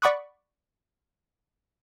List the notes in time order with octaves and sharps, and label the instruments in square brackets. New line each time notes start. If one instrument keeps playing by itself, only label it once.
[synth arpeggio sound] D5 F#5 B5 C#6 D#6 F#6